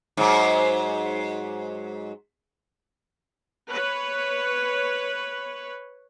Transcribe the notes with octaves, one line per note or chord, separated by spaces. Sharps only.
G#2 F#3
B4 C#5